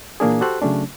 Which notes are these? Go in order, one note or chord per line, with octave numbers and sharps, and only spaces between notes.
A#2 E3 A#3 D4 G#4
F#4 G4 A4 C5 F#6
C#3 F#3 A3 C#4 D4